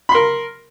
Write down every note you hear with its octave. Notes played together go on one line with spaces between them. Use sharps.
A#4 B5 C6